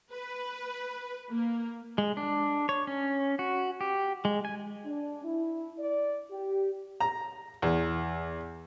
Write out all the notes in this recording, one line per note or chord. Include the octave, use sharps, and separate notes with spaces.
B4
A#3
G#3
D4
C#5
C#4
F#4
G4
G#3
G#5
D4
E4
D5
G4
A#5
E2